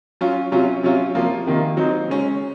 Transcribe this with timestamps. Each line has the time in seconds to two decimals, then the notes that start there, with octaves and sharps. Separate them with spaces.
0.21 F#3 C#4 F4
0.52 C3 F#3 C#4 F4
0.83 C3 F#3 C#4 F4
1.15 C3 F3 A#3 F4
1.46 C3 D#3 A#3 F4
1.77 F#3 C4 D#4
2.08 C#3 G#3 C#4